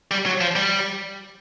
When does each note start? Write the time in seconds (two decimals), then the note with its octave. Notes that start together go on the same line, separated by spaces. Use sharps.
0.11 G3
0.26 F#3
0.41 F3
0.56 G3